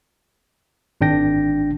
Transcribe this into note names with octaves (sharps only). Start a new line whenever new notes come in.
G#1 D4 G5 A#6